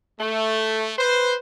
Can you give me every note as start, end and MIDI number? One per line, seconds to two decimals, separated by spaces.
0.19 0.91 57
0.98 1.34 71
0.98 1.34 72